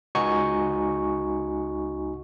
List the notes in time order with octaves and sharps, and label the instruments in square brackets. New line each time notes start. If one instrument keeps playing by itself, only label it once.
[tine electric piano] C#2 D#4 F#4 G#5 C#6 C#7